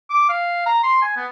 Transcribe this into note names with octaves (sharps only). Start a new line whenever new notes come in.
D6
F5
A#5
C6
G#5
B3